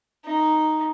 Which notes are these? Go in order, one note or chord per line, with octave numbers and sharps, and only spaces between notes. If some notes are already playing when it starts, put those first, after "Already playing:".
D#4